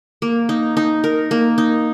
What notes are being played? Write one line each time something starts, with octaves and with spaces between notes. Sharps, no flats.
A#3
D#4
D#4
A#4
A#3
D#4